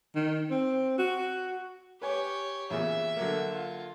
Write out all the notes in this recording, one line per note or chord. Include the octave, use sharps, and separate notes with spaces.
D#3
C4
F#4
G4 B4 C#5 G#5
E2 A#2 C#3 E5
D3 F#3 A#3
F4